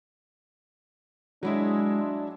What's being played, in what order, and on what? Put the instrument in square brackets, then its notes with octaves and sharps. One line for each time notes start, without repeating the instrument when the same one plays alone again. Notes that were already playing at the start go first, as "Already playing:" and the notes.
[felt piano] F#3 E4 E5 [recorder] G#3 [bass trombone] D4